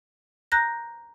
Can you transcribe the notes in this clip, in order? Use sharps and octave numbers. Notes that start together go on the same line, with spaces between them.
A#5 F#6 G6 A#6